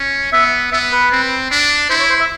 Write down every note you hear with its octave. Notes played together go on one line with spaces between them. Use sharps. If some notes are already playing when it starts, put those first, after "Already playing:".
Already playing: C#4
B3 E5
B3 E5
B4
C4
D4
E4 C5
C#5
C5
E5